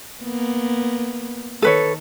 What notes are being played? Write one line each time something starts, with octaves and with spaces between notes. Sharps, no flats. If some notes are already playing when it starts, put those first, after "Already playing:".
A#3 B3
D#3 A4 B4 C#5